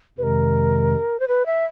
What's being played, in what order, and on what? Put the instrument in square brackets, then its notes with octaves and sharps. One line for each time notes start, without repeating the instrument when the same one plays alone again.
[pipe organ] F2 C3 D#3 G#3 [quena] A#4 B4
[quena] C5
B4
E5